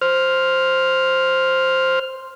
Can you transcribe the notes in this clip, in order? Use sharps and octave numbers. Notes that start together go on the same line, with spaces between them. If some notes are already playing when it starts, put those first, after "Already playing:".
C5 F6